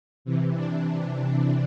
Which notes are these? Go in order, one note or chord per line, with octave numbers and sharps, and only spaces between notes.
C3 E3
D4
D4